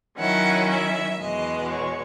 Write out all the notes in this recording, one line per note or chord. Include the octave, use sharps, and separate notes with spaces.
D#3 F#3 C#4 E4 F#5
E5
E2 B2 G#3 D#5
C#5